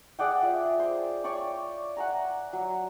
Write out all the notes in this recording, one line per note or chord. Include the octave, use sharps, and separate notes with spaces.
G#4 D5 F#5 G5
F4 E5
C5
C#5 D5 G5 C#6
F#5 G#5 A#5
F#3